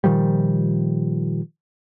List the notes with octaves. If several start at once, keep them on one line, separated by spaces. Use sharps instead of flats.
A#2 D#3 F3 G3